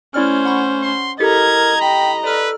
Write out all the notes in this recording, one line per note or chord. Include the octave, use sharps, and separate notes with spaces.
A3 C#4 E4 C5 D5 F6
F#5 B5 C#6
C6
E4 G4 A4 A#4 D#5 A#5 G#6
G5 B5
A4 B4 D5 F6